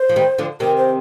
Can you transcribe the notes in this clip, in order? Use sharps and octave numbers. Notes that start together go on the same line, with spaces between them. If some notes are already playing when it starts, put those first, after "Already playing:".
Already playing: C5
F3
D#3 G3
D3 F3
C3 D#3 A#4
C5